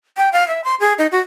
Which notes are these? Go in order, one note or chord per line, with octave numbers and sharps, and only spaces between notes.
G5
F5
E5
C6
G#4
D#4
F#4